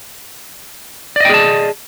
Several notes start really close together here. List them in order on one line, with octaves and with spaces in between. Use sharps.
D5 D#5 G5 G#4 A5